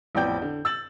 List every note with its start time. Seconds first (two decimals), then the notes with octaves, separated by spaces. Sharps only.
0.15 A1 F2 B3 D5 G5 G6
0.42 D3
0.65 E6 A6 F#7